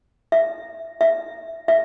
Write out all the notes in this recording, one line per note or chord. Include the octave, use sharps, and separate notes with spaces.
E5
E5
E5